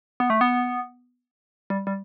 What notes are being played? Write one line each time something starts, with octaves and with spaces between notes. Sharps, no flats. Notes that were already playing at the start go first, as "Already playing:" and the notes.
B3
A3
B3
G3
G3